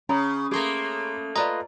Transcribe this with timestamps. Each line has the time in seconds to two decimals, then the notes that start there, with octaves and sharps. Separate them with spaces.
0.09 C#3 C#4 A#5 B5 D#6
0.51 A3 A#3 G#4 A#5 C6 D6
1.36 F4 B4 D5 D#5 A#5